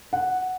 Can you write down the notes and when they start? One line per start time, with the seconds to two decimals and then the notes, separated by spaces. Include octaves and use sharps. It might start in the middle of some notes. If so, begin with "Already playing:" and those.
0.13 F#5